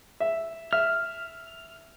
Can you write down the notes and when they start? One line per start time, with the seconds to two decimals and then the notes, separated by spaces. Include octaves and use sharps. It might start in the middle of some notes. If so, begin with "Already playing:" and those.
0.20 E5
0.73 E5 F6